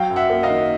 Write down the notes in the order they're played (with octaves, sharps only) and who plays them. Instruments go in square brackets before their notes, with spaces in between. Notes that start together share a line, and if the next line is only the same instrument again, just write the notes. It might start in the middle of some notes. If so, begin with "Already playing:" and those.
Already playing: [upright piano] F#3 F5 G5
F#2
E5 F#5
A#3
D#5 F5
D#3